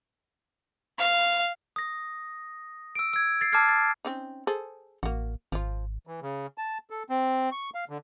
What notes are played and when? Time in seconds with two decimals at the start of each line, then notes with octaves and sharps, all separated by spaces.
0.98 F5
1.76 D#6 A#6
2.95 E6 D7
3.13 E6 G#6
3.41 A6 C7
3.52 A5 D6 E6 F6 G#6 C7
3.69 A6
4.05 C4 C#4 D#4
4.47 G#4 A4 C5
5.03 A1 A#3 F#4
5.52 G#1 F3 F4
6.07 E3
6.22 C#3
6.58 A5
6.90 A4
7.10 C4
7.52 C#6
7.75 F5
7.89 D3